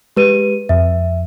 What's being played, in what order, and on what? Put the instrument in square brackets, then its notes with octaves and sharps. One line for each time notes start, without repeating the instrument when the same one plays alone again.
[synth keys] G#3 [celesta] G4 B4 D#7
[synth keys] F2 [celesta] E5